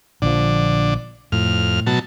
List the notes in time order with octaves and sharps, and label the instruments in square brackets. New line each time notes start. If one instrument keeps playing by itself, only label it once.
[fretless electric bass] A#1 F3 [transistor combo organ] D3 D5
[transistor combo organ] F2 F6 [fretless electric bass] A2
[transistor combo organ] B2 F#3 A5